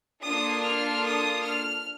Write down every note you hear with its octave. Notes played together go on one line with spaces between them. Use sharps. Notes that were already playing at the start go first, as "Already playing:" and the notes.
A#3 D4 F4 A4 D#6
F6
D#6
F6